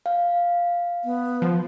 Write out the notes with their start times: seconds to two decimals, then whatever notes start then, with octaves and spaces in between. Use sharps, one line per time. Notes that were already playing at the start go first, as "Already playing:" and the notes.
0.06 F5
1.04 B3
1.42 F3